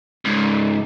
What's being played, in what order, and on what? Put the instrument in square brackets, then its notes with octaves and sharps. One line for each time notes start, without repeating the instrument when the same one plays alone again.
[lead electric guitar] C#2 G#2